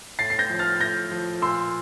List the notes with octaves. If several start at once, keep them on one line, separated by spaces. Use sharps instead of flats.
A2 A6 C7
C7
G6 A#6
F3
F6 A6
A2 G6 A#6
F3
A#2 C6 E6